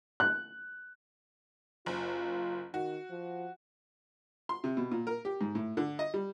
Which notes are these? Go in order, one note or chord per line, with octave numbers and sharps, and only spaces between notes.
F#6
F#1 F4
D#3 F#4
F3
C6
C3
B2
A#2
A#4
G4
G#2
A2
D3
D#5
G3